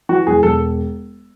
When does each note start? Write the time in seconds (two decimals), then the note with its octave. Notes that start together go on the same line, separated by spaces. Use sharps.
0.09 E3 F#4
0.27 E1 G#4
0.43 E1 A4